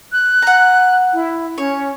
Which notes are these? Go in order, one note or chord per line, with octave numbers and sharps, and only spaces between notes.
F#6
F#5 A#5
E4
C#4 C#5